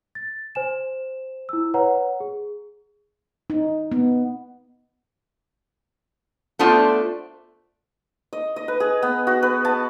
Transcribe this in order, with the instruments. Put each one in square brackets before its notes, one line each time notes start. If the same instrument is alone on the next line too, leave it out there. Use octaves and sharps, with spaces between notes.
[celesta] A6
C5 G#5 E7
E4 E6
B4 C#5 F#5 A#5
G#4
[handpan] D#4
B3
[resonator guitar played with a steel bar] A3 B3 D4 F4 C5
[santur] D#5
D#5
B4
G#4
B3
F#4
B4
A5